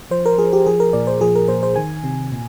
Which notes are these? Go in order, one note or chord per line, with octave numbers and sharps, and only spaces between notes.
F3 C5
A#4
F3 G#4
G4
F3 G#4
A#4
A#2 D5
C5
F3 G#4
A#4
A#2 C5
C5
D#3 G#5
C3
A#2